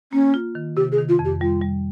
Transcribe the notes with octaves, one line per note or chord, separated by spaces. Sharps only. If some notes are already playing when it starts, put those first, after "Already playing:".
A#3 C#4
F4
D#3
C3 G4
G#4
D#3
F4
F2
G4
G3 F4
G3